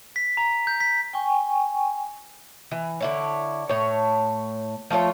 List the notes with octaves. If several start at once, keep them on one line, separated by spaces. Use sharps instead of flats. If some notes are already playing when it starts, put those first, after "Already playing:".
B6
A#5
G6
B6
G5 G#5 C#6
E3
D3 E4 C#5
A2 C#5
F3 A3 F4 C#5